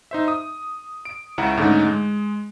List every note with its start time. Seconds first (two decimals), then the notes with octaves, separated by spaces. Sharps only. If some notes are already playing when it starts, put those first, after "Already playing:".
0.11 D#4 C5 E5
0.28 D#6
1.05 D7
1.38 C#2 C#3 E4 F#5 A#5
1.57 G#2 D3 A3 C#4 D#4
1.86 G#3